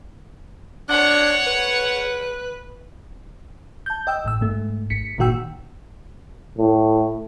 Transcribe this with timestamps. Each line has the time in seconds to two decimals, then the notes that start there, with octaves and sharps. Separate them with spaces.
0.89 D4 C#5 F#5
1.47 B4
3.86 A5 G6
4.07 D#5 G5 E6
4.24 A1 A2 E6
4.41 G#2 A3
4.90 G#1 B6 C#7
5.18 G1 A#2 D#3 F#4 G5 E6
6.58 A2